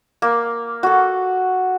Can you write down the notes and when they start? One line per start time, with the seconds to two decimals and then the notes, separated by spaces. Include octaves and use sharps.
0.22 A#3
0.83 F#4 A4